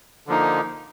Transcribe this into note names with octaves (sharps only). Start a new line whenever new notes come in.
D3 F3 A#3 D#4